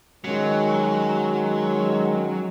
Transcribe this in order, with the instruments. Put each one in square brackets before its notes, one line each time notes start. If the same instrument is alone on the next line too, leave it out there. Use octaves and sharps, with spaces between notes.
[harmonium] D#3 G#3 C#4 [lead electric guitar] F#3